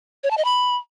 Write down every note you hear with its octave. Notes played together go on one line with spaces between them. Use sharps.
C#5
A5
D#5
B5